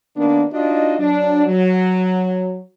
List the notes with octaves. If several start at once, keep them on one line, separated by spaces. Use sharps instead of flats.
D#3 A#3 B3 D4
D4 D#4 F4 F#4 D#5
F#3 D4
F#3